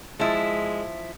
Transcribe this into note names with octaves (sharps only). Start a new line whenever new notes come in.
F3 G#3 E4